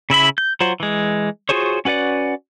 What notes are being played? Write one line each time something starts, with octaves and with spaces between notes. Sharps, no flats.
C#3 E4 E5 B5
G6
F#3 F4 F#4 C5
E3 G#3
F4 F#4 G#4 C5 C#5
C#4 F#4 B4 D5 F#5